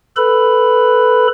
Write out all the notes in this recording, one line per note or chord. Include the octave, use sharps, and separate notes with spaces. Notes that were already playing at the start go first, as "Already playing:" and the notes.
A4 B4 B5